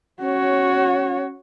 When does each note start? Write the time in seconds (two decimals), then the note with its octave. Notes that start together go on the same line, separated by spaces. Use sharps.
0.22 C#4 F#4 C#5